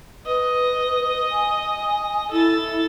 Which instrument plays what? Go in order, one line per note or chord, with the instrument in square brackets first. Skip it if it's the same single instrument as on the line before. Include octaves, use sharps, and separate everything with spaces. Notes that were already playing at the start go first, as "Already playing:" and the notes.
[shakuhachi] B4 [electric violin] D#5
[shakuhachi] G#5
[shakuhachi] E4 [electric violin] A4 A6